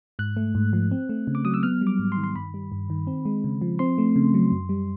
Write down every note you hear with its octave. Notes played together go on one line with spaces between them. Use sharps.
G#2 F#6
A3
G#2
F3
C4
A3
C#3
D6
F#3 D#6
E6
B3 F6
G3
D6
G#2
C6
D#3
C6
G2 B5
G3
G2
D#3
C4
G#3
C#3
F3
C4 C6
A3
C#3
F#3
F#2
G3